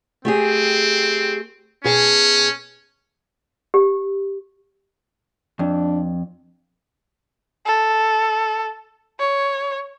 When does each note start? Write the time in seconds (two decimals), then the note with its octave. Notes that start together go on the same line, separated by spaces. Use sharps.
0.25 A3 C4 G4 G#4
1.84 B2 C#4 G#4 A5
3.74 G4
5.59 F2 D4
7.66 A4
9.20 C#5